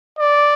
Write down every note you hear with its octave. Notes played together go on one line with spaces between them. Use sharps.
D5